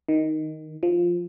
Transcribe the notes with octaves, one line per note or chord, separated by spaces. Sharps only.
D#3
F3